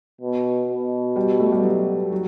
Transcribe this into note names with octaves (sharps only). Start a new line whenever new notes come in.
B2
B2
G3
A3
G3
F#3
F#3